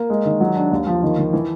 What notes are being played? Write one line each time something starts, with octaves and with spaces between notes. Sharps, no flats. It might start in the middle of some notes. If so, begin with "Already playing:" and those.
Already playing: A#3
G#3
D#3
F#3
D4
D#2
F3
D#3
D#3
E3